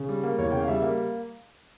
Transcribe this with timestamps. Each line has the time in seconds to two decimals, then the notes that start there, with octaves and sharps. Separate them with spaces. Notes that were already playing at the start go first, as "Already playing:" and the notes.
Already playing: C#3
0.09 G3
0.24 A#3
0.38 E2 C#5
0.52 C#3 G5
0.60 F5
0.68 G3 E5
0.82 A#3